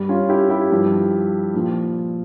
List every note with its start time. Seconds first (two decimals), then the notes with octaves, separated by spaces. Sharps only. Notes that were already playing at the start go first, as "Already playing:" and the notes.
Already playing: G2 G3
0.09 C#4 F4
0.29 E4 G4
0.50 E4 G4
0.71 G2 F3
1.54 A#2 F3